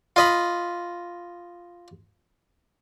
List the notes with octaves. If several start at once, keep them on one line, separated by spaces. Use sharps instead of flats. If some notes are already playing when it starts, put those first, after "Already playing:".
F4 D#5 B5